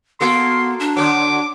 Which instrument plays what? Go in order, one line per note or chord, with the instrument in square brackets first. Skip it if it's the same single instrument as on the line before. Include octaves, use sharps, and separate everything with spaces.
[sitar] A#3 F#4 A4 [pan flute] B3 [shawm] C6
[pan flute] D4
[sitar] D3 F#3 [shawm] D6